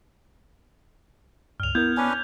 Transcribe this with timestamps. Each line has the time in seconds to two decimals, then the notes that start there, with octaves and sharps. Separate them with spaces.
1.60 C#2 G2 F6 F7
1.75 B3 E4 A#4 G6 G#6 F7
1.97 C#4 D4 B4 G#5